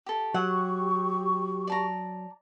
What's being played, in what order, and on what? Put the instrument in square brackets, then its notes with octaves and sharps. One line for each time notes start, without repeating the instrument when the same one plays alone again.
[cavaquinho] G4 A4
[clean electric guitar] F#3 [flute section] G4 C#6 [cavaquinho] F#5
[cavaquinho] D5 A5 A#5